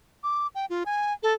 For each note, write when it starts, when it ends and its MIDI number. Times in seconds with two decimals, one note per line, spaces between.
0.23 0.47 86
0.55 0.66 79
0.70 0.84 65
0.86 1.13 80
1.23 1.33 69